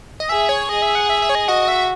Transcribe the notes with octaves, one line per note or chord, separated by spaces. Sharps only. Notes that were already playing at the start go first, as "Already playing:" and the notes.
D#5
G#4 E5
C#5
G#4 D#5
E5
F#5
E5
E5
C#5
D#5
F#4 D#5
E5